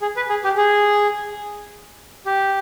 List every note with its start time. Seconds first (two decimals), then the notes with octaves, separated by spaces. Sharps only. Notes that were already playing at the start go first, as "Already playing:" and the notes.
0.02 G#4
0.16 B4
0.29 G#4
0.44 G4
0.57 G#4
2.26 G4